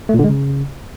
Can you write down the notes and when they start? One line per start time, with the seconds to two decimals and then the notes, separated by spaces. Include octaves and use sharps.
0.09 A3
0.14 A#2
0.19 D3
0.24 G#3
0.29 C#3